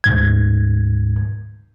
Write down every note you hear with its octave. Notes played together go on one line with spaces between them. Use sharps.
D2 G#2 G#6